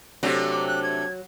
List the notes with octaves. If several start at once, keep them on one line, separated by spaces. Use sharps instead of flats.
C3 F#3 A3 D4
D6
F#6
G#6